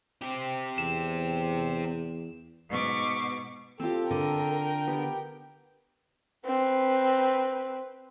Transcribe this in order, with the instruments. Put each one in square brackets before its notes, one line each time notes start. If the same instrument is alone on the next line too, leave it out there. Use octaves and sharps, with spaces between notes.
[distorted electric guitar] C4 G4
[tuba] E2 [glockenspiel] E7
[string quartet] G#2 B2 C#6 D6
[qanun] C4 F4 [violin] G4 [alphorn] A4
[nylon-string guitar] D3 [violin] A#4 G5
[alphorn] B3 [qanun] G4
[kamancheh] C4 B4